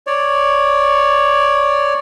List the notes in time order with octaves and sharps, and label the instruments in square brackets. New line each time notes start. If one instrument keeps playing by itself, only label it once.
[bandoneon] C#5 D5